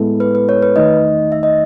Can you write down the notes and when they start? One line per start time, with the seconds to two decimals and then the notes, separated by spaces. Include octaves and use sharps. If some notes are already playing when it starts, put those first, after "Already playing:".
Already playing: A2 G#3 B3 E4 A4
0.20 B4
0.35 B4
0.49 C#5
0.62 B4
0.76 E2 D#3 A3 D#4 D#5
1.32 E5
1.43 D#5